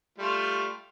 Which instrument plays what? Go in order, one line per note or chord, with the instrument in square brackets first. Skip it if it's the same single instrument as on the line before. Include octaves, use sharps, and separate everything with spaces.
[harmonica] G3 A3 F4